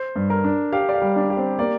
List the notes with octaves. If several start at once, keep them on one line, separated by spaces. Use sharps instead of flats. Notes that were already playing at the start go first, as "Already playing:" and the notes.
Already playing: C5
G2
A#4
D4
G4 F5
D5
F5
G3
D4
G4
C4
A#3 D5